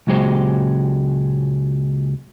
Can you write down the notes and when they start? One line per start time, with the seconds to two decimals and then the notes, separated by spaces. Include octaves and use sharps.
0.07 C#2 A#2 F#3 G#3 G4 C5